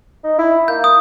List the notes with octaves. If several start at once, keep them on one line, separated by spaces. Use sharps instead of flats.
D#4
E4
A#3 G6
D#6